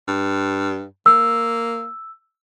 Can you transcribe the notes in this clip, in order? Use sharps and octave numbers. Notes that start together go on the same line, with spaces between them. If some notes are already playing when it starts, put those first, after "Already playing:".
G2
A#3 E6